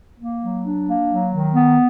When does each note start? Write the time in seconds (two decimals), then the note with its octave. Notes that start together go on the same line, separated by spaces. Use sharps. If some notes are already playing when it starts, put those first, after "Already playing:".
0.19 A#3
0.42 F#3
0.64 D4
0.86 A#3
1.09 F#3
1.31 D#3
1.53 B3